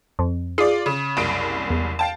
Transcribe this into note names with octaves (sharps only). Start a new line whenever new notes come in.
F2
F4 G#4 D5
C#3
F#1 C2 D7
E2
F5 G5 A5